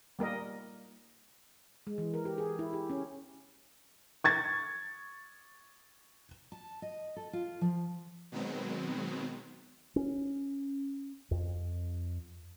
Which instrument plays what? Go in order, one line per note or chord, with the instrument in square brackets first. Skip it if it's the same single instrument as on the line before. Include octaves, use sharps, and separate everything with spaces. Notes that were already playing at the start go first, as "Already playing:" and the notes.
[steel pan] G3 A#3 A#4 D#5
[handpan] G#3
E3
A#4
G4
G#4
E4
G4
C#4
[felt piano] C#6 G#6 A6
[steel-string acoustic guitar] A5
D#5
A4
F4
F3
[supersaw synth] B2 D#3 F#3 G#3 B3 C4
[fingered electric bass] C#4
F2